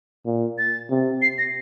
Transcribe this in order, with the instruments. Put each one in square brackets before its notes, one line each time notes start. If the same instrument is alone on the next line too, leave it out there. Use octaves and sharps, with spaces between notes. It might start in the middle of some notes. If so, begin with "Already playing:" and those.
[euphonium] A#2
[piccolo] A6
[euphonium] C3
[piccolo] C7
A#6